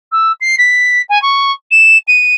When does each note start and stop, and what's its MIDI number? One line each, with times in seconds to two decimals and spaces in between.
0.12 0.32 88
0.41 0.55 96
0.58 1.02 95
1.09 1.21 80
1.22 1.51 85
1.71 1.98 100
2.07 2.35 99